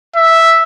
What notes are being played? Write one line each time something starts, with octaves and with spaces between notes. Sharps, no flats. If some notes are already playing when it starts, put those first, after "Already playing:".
E5